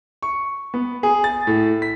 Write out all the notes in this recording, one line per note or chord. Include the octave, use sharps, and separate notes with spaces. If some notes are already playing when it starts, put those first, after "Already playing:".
C#6
B3
G#4
A6
A2
B6